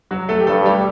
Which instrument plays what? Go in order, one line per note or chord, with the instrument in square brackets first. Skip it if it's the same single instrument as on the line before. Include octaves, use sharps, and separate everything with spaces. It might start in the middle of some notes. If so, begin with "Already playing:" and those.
[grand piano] F#3 F#4
A3 A4
G4
[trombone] G2 [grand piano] A3 A4
[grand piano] G3 G4